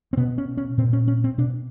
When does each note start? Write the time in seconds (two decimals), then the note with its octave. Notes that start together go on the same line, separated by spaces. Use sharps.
0.13 C4
0.17 B2 B3
0.38 C#4
0.57 C#4
0.78 A#2 C4
0.93 C#4
1.08 C#4
1.24 C4
1.38 B2 D4